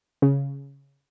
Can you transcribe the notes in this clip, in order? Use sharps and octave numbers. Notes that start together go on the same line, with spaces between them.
C#3